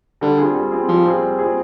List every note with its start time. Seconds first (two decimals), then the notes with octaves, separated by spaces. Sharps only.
0.21 D3 G3
0.38 C4 F4 G#4
0.55 G3
0.72 C4 F4 G#4
0.88 F3 G3
1.05 C4 F4 G#4
1.22 G3
1.39 C4 F4 G#4